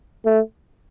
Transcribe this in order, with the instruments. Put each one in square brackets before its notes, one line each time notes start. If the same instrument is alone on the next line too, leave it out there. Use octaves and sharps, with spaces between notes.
[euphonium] A3